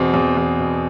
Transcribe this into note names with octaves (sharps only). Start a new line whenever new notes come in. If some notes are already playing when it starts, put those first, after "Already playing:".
Already playing: E2 B2 C4
E2
E2
B2